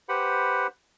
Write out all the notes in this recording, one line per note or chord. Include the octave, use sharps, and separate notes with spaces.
G4 B4 C5 F#5 B5